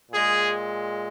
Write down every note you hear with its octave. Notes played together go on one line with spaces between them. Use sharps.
A#2 G#3 G#4